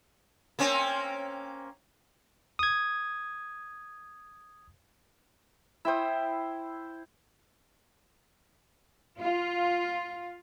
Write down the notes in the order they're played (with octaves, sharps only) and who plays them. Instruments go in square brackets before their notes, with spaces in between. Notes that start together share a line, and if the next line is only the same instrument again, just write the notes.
[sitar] A#3 C4 C#4
[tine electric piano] D#6 G#6
[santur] E4 C5 [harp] E5 G5 D#6
[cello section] F4